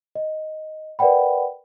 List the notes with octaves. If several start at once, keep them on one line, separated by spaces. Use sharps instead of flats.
D#5
A#4 B4 D5 F#5 G5 B5